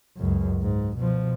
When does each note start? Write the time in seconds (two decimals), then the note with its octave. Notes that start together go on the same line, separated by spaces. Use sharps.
0.17 C#2 F#2
0.62 G#2
0.97 B2 F3